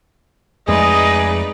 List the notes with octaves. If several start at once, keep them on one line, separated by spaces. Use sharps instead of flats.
F2 G#3 A3 D#4 G#4 B4 D5 D#5